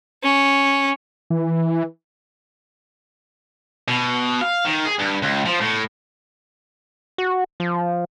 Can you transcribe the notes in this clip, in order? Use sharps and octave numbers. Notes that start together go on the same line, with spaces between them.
C#4
E3
B2
F5
D#3
G#4
G2
C#2
F3
A2
F#4
F3